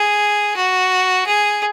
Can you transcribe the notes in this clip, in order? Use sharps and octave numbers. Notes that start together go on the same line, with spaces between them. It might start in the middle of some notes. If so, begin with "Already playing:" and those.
Already playing: G#4
F#4
G#4